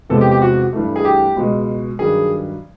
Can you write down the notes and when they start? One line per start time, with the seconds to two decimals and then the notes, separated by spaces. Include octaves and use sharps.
0.10 E2 C3 F3 G#3 B3 A4
0.21 G4
0.31 G4
0.42 F#4
0.73 G2 E3 A3
0.96 G#4
1.05 G4
1.36 C#2 B2 G#3
1.99 G2 D#3 F#3 G#4